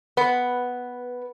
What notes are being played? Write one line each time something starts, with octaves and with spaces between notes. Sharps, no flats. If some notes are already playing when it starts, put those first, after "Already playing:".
B3 B4